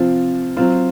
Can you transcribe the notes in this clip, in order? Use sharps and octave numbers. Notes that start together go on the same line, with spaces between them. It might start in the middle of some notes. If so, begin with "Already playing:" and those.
Already playing: C3 F3 C4 F4
F#3 C4 F4